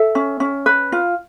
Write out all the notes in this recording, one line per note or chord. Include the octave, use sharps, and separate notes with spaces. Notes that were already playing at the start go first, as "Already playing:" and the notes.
Already playing: A4 E5
C#4
C#4
B4
F4